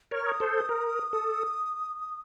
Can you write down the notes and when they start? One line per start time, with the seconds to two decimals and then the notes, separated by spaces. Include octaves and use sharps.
0.11 A#4 C#5 F6
0.27 D#6
0.40 A4 C5
0.69 A#4
1.13 A4